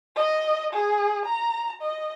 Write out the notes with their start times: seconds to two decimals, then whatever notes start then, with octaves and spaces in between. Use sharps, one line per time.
0.16 D#5
0.73 G#4
1.25 A#5
1.81 D#5